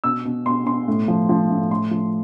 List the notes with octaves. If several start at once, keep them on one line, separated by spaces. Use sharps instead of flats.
B2 E6
B2
B2 C6
B2 C6
A2
F3
F3
A2
A2 C6
F3